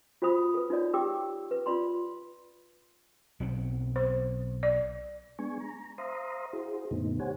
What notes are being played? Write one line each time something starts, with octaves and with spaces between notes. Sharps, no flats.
F4 F#4 C5 B5 D#6
A4 B4
D#4 F4 F#4 C#5 D5
G4 G5 D6 E6
B4
F4 D5 B5 C6
B1 F#3 C4
C5
D5
G#3 B3 D4 G#5 C#6
A#5
C5 E5 F5 A#5 C6 D#6
E4 F#4 G#4 C5
F#2 A#2 D3 A3 B3 D#4
G4 C5 C#5 F#5 G#5